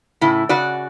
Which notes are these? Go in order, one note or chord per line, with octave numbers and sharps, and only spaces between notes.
A2 C#3 E4
C#3 F#4 D5